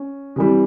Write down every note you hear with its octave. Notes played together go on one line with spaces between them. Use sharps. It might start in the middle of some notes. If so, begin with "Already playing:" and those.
Already playing: C#4
C3 E3 G3